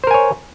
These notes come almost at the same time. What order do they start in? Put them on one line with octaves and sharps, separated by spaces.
C5 A#4 G#5 C#5